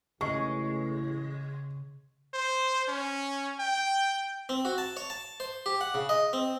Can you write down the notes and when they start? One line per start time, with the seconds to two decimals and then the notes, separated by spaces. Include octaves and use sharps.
0.21 A1 C#3 G#3 C#6
2.34 C5
2.88 C#4
3.59 G5
4.49 C4
4.65 F#4
4.78 A5
4.97 C#5
5.10 A5
5.40 C5
5.66 G4
5.81 F#5
5.94 C#3
6.09 D#5
6.33 C4